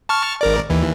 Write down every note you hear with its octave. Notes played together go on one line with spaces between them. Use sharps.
A5 C#6 F6
G#1 A#4 D5
D#2 E3